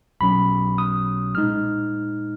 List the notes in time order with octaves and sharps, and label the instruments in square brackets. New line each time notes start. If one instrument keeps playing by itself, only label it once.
[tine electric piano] B1 B2 F#3 C#4 B5
D#6
A#2 G#3 D#4 F6